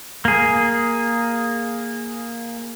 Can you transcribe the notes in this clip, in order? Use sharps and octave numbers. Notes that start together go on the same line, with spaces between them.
A#3 G#4